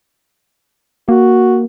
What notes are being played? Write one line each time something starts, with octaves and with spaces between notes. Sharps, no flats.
A#3 F#4